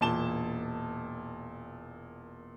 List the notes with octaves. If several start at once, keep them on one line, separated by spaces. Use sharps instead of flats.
E1 A#2 A5 E7 G7